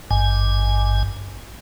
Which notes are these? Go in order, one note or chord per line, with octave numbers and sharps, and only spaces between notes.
G#1 G2 G#5